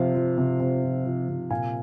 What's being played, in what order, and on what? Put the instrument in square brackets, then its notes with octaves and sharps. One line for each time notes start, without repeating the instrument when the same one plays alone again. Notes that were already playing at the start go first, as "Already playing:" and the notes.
Already playing: [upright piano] C3 F3 F5
F3
C3
C3
F3
F3
C3
A#2 F5 G#5